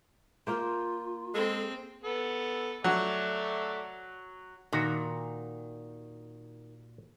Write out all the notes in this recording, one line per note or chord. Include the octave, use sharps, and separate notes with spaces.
A#3 F4 C5
G#3 C4 A4
B3 A4
F#3 A3 D5 E5
A#2 D#3 F#4